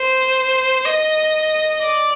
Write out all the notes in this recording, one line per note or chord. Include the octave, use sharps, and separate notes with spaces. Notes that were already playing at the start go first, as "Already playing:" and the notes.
Already playing: C5
D#5
D5